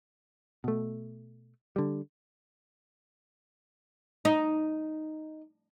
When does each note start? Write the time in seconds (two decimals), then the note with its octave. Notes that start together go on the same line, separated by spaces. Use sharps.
0.64 B2 A3
1.76 D3 G3
4.25 D#4